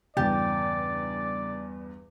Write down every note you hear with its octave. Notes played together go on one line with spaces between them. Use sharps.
E2 G2 C#3 G4 D5 A6